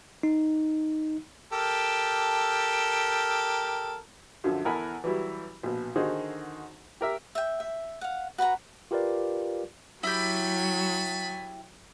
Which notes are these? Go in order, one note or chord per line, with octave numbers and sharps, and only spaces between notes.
D#4
G4 A4 A#4
F#2 D3 F3
E2 A4 A#4 F#5 G#5 B5
E3 F#3 G3 E4
A#1 B2
D3 D#3 D#4 F#4 G#4 C5
G4 A#4 E5
E5 G5
E5
F5 F#5
F#4 B4 F#5 A#5
F4 G4 A#4 B4 D5 F5
F#3 E4 G4 G#5 A5 B5